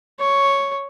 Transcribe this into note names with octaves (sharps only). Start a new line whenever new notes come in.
C#5